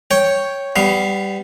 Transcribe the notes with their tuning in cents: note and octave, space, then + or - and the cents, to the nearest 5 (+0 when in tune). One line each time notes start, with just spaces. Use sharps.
C#5 +0 G5 +0
G3 +0 B3 +25 F5 +0